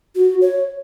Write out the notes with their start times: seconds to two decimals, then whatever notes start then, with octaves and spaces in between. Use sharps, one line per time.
0.15 F#4
0.41 C#5